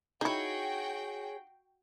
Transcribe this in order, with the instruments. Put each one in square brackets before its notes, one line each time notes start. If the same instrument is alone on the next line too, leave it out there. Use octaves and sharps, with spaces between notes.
[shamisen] D#4 E4 [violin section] F#4 G5 [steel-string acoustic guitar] G#4 C#5